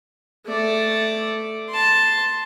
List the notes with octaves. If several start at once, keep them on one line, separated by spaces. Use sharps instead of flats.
A3 D5
A5 C6